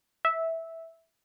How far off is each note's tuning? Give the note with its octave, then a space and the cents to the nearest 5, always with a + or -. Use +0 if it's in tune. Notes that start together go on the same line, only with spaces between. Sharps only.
E5 -10